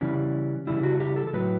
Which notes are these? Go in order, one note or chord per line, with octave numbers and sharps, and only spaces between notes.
C#3 E3 G3 C#4
C#3 E3 G3 E4
F#4
G4
A4
A4
A2 F#3 B4